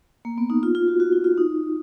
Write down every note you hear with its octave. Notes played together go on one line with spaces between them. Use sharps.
A#3
B3
D#4
F4
F4
F#4
F#4
F4
F4
D#4